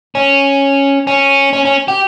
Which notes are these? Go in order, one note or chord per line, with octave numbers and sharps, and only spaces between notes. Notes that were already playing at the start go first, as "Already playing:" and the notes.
C#4
C#4
C#4
C#4
G4